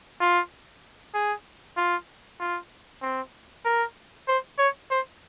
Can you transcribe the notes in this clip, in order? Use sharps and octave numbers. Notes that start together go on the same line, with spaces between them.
F4
G#4
F4
F4
C4
A#4
C5
C#5
C5